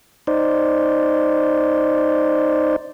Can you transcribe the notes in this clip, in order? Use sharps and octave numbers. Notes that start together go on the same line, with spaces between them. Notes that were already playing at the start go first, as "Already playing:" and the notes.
D#4 C5 D5